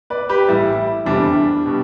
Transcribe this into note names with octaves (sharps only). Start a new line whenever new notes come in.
B4 D5
G4 B4
A1 A2 E3 G3 E4
F1 E2 C3 E3 G3 D4
B2 G3